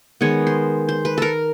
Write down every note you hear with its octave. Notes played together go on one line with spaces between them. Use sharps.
D#3 G#3 B3 C#5
C5
C5
B4
A4 A#4